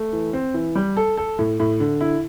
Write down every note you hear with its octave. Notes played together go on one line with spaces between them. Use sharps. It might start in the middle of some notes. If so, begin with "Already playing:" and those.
Already playing: A3
E3
C4
E3
G3
A4
A4
A2
A2
D3
E4